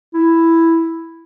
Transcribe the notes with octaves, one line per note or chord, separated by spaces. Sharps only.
E4